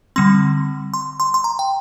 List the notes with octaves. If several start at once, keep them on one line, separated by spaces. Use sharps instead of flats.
D3 G3 C4 C6
C6
C6
C6
A#5
G5